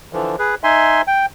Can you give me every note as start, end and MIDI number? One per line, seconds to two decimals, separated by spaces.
0.13 0.36 50
0.13 0.36 52
0.13 0.36 53
0.39 0.55 68
0.39 0.55 71
0.64 1.02 63
0.64 1.02 76
0.64 1.02 80
0.64 1.02 84
1.07 1.26 79